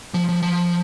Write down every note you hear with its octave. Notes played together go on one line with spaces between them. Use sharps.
F3
F3
F3